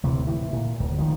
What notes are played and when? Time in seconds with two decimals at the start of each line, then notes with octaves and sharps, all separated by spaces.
0.03 D1 C3 E3
0.27 A2 E3
0.53 A#2
0.80 D1
0.98 D#3 F3